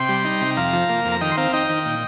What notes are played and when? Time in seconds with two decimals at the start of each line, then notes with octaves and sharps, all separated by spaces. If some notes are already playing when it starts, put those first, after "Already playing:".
Already playing: C3 G5 C6
0.09 G3
0.25 D#4
0.41 C3
0.57 F2 F5 A#5
0.73 F3
0.89 A#3
1.05 F2
1.12 A#5
1.21 D#3 D#5 G5
1.32 C6
1.37 C4 F5 A#5
1.53 D#4 D#5 G5
1.69 D#3
1.86 A#2